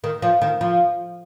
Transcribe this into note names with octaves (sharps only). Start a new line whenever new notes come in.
D#3
F3
D#3
F3